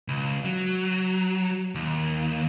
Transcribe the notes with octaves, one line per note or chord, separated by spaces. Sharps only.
C#2
F#3
D#2